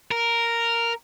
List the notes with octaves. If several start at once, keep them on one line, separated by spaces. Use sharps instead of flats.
A#4